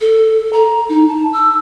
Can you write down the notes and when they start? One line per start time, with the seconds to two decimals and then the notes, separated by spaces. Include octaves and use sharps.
0.01 A4
0.53 A#5
0.89 D#4
1.08 A5
1.33 E6